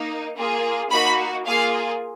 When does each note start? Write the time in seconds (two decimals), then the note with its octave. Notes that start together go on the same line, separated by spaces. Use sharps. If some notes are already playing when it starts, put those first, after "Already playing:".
Already playing: A#3 D#4
0.37 A#3 F4 G#4
0.91 A#3 D#4 F#4 B5
1.46 A#3 F4 G#4 F5